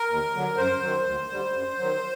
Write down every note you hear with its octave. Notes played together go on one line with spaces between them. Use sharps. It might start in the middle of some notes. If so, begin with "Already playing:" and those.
Already playing: A#4
D#2
D3 F#3
F#2 C5
D#3 F#3
D2
D3 G3
F#2
D#3 F#3